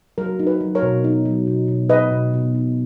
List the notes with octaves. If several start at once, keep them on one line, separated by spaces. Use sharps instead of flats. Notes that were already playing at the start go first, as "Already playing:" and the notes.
F#3 A#4
D#4
B4
F#3
A#4 C#5
B2
D#4
F#3
B2
B2
D#4 B4 D#5
B2
B2
D#4